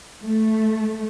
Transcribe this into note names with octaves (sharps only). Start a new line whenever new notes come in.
A3